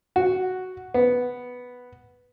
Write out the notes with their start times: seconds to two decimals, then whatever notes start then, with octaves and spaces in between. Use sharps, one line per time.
0.16 F#4
0.94 B3